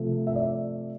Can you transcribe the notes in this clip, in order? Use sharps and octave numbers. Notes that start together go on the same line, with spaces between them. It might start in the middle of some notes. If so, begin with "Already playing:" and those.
Already playing: C3 F3 A3
E5
D5